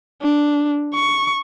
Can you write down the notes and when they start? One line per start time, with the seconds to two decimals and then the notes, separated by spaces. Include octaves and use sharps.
0.22 D4
0.95 C#6